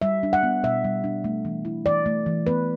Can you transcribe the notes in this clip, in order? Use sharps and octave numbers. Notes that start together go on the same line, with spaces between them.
G3 E5
D4
F#5
B3
B2 E5
G3
D4
A3
E3
E4
E3 D5
A3
E3
B3 B4